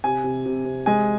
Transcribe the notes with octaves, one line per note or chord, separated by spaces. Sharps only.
C3 G#5
C3
C3
C3
G#3 G#5